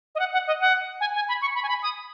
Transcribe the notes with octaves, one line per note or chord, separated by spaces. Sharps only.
D#5
F#5
F#5
D#5
F#5
G#5
G#5
B5
C#6
B5
G#5
B5
D#6